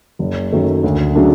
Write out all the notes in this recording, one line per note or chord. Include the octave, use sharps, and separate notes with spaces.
F#1
F#2 D#3 F#3 A3
D2
C#3 F#3 A3 D4